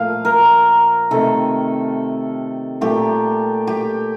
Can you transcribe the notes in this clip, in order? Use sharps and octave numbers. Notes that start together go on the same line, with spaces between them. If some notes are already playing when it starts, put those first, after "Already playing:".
Already playing: A#2 F3 A3 F5
A#4
C3 D#3 A3 A4
A#2 A3 G4
G4